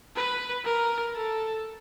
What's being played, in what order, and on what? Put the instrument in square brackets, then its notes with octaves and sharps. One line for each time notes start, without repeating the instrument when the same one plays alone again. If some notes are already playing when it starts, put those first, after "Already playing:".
[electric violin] B4
A#4
A4